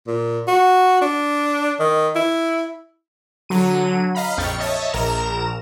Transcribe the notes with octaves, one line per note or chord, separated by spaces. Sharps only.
A#2
F#4
D4
D#3
E4
D3 F#3 D#7
D#5 F5 A#5 B5
A#1 F2 G5 C#6 A6
C#5 D#5 E5 A5
A#1 A#4 A#5 E7